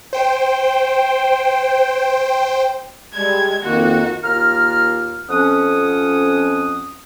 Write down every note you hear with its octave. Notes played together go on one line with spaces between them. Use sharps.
C5 G5
G3 G#3 G#6
F2 D#3 A#3 F#4
D#2 A#3 F4 A#5 F6
F2 C#4 F#5 D#6